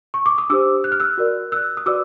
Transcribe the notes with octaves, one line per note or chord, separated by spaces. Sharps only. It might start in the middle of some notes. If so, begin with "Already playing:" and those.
C#6
D6
D#6
D4 G4 C5 D6 E6
F#6
F6
E6 F#6
F#4 A#4 D5
E6 F#6
D#6
F#4 B4 D5 D6 E6